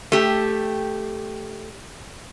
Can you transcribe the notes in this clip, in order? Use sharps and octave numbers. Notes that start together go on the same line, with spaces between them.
A3 G4